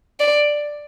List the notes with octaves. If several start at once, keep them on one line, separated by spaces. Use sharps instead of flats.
D5